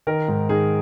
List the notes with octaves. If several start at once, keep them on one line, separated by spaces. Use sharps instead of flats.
D#3 A#4
G#2
D#3 G#4